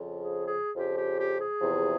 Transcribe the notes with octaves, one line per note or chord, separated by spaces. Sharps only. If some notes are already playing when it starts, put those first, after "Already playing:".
Already playing: F2 C#3 F3
G#4
G#4
F2 C#3 F3 G4
G4
G4
G#4
E2 C3 F3